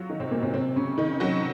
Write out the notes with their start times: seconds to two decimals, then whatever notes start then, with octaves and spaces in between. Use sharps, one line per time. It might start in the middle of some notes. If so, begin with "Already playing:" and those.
Already playing: F#3 F4 F#4
0.10 D#3 D#4
0.20 C3 C4
0.31 A#2 A#3
0.42 C3 C4
0.54 C3 C4
0.76 C#3 C#4
0.98 D#3 D#4
1.20 F#3 F#4